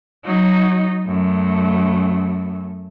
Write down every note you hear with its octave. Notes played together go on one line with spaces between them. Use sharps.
F#3 D#4
F#2 A3